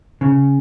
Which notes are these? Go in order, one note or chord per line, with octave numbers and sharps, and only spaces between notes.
C#3